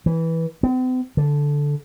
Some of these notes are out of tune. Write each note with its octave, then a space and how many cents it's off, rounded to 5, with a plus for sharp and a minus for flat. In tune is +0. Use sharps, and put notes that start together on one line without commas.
E3 -10
C4 -45
D3 -10